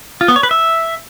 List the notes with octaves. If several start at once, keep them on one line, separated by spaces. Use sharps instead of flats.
F4
B3
C#5
B4
E5